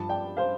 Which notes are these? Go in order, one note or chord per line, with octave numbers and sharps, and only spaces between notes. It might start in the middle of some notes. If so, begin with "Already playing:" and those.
Already playing: G2 F3 A5
D5 G5
C5 F5